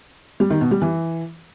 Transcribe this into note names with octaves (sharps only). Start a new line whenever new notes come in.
G3
D#3
B2
G3
E3